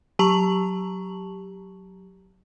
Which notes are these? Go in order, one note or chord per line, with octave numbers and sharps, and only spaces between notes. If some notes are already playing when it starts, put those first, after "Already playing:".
F#3 G4 A5 A#5 C#6 F#7